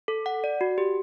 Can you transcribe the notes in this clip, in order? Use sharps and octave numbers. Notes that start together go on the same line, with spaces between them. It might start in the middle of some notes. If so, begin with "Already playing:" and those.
A4
F#5
D5
F#4
G4